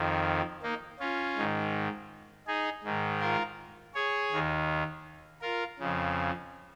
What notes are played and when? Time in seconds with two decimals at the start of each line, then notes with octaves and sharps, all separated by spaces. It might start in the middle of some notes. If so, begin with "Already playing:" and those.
Already playing: F2 D#3
0.63 A#3 D#4
1.00 C#4 F4
1.37 G#2 D#3
2.47 D#4 G#4
2.84 G#2 D#3
3.21 F4 A#4
3.94 G#4 C#5
4.32 D#2 D#3
5.42 F4 A#4
5.79 F2 C#3